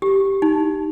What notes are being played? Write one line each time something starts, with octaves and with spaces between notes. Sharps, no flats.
G4
D#4